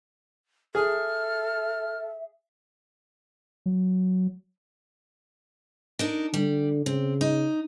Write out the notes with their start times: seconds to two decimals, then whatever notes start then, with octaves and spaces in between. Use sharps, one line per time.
0.75 G#4 A4 E5 F6
3.66 F#3
5.99 D4 D#4 A#4
6.34 D3 G3
6.86 C#3 C4
7.21 D#4